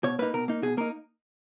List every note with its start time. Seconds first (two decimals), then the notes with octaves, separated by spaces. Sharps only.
0.04 B2 C#5
0.19 A#3 D#4 B4
0.34 B2 A#4
0.48 A#3 D#4
0.62 B2 G#4
0.77 A#3 D#4 A#4